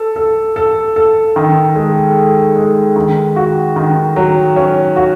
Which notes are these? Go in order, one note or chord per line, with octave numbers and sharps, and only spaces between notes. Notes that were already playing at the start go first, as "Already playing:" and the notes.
Already playing: A4
A4
A4
A4
D#3
G#3
G#3
G#3
D#3
F#4
D#3
F#3
C#4
F#4